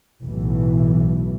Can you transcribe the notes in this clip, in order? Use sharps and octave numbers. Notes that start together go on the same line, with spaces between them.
B1 A2 E3